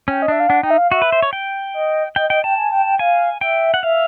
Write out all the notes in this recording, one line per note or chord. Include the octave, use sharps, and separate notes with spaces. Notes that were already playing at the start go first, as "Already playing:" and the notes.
C#4 G5
D#5
D4 E5
F5
D4 F#5
D#4 G5
E5
F5
F#4 E5
B4
C5
C#5
G5
D#5
D#5 G5
D#5 G5
G5 A5
G#5
G5
G5
F5 G#5
E5 G5
F#5
E5 F5